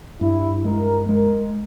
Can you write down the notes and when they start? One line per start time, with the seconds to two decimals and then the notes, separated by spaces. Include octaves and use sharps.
0.21 G2 E4
0.65 G#3 A#4
1.09 G#3 A#4